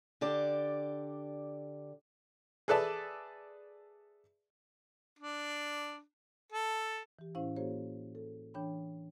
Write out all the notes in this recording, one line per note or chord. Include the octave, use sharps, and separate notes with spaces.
D3 G4 D5
G#4 A4 B4 D5 E5 A5
D4
A4
E3 G4
A2 C#4 E4 C5 F5
A#3 F#4 G#4 C5 C#5
A4
E3 D4 C#5 G5 B5